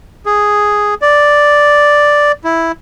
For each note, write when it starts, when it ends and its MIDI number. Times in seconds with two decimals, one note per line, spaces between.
0.26 0.94 68
1.02 2.32 74
2.44 2.72 64